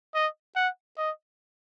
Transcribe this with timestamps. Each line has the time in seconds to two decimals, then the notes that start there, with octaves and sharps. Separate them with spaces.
0.14 D#5
0.56 F#5
0.98 D#5